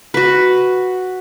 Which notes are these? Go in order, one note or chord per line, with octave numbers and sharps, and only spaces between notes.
F#4 B4